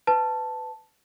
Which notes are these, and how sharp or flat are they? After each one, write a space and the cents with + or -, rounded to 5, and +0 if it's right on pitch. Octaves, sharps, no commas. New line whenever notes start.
B4 +20 A5 +0